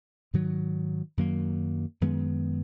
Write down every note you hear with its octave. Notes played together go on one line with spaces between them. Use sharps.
G#2 D#3 F#3
F#2 D#3 F#3 A#3
F#2 D#3 G#3 B3